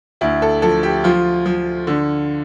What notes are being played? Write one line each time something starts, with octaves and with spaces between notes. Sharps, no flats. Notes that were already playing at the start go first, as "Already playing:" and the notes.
D2 E4
A4
F3 A4
G4
F3 F4
F3
D3